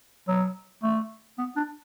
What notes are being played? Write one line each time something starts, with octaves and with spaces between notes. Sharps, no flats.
F#3
A3
B3
D4